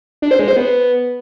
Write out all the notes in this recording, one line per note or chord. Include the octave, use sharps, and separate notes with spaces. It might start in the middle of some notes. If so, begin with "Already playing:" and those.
D4
C5
G#3
C5
B3